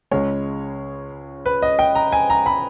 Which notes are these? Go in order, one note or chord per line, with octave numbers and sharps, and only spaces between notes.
C#2 C#3 G#3 C#5
B4
D#5
G5
A#5
G#5
A#5
B5